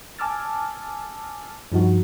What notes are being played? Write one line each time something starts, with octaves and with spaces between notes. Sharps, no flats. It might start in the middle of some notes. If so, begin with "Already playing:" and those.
G#5 A5 D6 E6 F6 A6
G2 F3 D#4 F#4